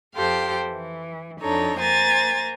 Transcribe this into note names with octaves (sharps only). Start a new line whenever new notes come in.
F2 G4 A4 C5 F5 G5
E3
F2 D4 D#4 A4 C#5 A#5
A#3 C5 G#5 A#5 A6